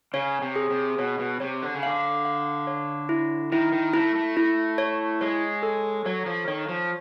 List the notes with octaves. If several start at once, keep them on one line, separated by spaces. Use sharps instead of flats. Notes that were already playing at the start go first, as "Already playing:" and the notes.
C#3 C#5
C3
G#4
C3
B2 C#5
B2
C3 C#5
D3
C#3
D3 F5
F5
C#5
E4
D#3 E4
D#3
A3 E4
A3
E4
C#5
G#3 C#5
A4
F#3 C#5
F3
D#3 C#5
F3